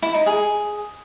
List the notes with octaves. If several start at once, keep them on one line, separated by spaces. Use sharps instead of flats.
E4
D#4
G#4